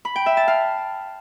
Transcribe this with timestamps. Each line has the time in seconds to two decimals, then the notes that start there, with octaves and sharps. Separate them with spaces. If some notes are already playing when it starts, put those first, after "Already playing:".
0.05 B5
0.16 G5
0.26 E5
0.37 A5
0.48 F5